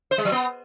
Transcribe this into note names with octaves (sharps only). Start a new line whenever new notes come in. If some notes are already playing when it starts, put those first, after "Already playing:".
C5
G#3
F#3
B3